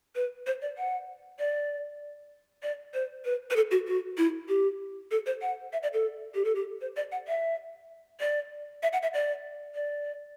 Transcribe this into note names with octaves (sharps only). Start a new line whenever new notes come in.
B4
C5
D5
F#5
D5
D5
C5
B4
B4
A4
F#4
F#4
E4
G4
A4
C5
F#5
E5
D5
A4
G4
A4
G4
C5
D5
F#5
E5
D5
E5
F#5
E5
D5
D5